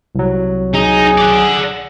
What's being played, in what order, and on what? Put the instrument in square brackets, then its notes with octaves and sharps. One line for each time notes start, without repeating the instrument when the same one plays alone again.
[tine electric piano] C2 F#3
[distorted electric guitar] D#4 [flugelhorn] G#4
[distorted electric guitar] D5 F#5